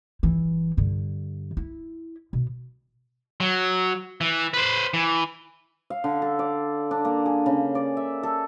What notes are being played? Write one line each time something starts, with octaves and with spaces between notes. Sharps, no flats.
G1 E3
G2 D3
E4
B2
F#3
E3
B4 C5
E3
F5
D3
A4
D5
D4
A#3
G#4
C#3
D5
E5
A4